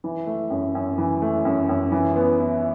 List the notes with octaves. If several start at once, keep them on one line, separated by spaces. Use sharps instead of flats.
E3
A3
F#2
F#2
E3
A3
F#2
F#2
E3
B3
E4